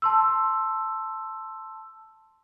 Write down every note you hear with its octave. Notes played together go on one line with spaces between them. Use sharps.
A5 C6 E6